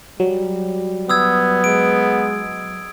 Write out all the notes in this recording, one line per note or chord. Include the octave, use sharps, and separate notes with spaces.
F#3 G3
B3 D#6 E6 G#6
G#3 D7